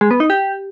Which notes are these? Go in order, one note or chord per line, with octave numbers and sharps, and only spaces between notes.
G#3
B3
D#4
G4